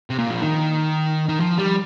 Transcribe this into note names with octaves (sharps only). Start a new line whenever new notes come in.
C3
A#2
F3
D#3
D#3
F3
G3